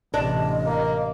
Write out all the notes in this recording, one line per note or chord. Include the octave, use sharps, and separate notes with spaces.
A1 C3 D4 D#5
A#3